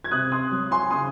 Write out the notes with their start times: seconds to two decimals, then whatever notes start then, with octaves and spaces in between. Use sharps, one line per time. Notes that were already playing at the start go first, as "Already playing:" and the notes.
0.04 G#6
0.11 C3 D#6 F#6
0.32 C6 D#6
0.51 F#3
0.71 G#5 C6
0.90 C#3 C6 D#6